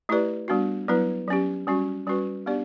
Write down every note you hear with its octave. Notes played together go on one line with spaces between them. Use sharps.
A3 E4 G4 B4 D5
G3 B3 D4 F#4
F#3 B3 E4 B4
F#3 C#4 G4
G3 C#4 F#4
G3 C#4 F#4 B4
B3 D4 G4 D5